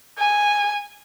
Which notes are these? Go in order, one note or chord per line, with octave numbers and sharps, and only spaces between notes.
G#5